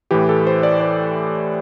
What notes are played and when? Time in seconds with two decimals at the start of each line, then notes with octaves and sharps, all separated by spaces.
0.11 A2 E3 G4
0.29 A4
0.47 C5
0.63 D5
0.81 D5